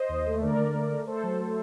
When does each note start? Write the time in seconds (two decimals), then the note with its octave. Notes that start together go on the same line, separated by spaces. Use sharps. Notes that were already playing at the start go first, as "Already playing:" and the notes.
Already playing: C5 D#5
0.09 D#2
0.26 A3
0.41 D3 A#4 D5
0.58 D3
0.74 A3
0.91 A3
1.07 A3 A4 C5
1.23 F#3
1.39 A3